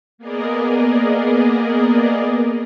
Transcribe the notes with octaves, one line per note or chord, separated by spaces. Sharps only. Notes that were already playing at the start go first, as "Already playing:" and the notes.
A#3 B3 G#4 A#4 D5 D#5